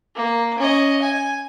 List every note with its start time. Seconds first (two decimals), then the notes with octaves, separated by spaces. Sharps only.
0.16 A#3
0.58 C#4 D#5
1.02 G#5